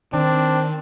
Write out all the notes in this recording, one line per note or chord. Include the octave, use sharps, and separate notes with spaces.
D#3 C4 D4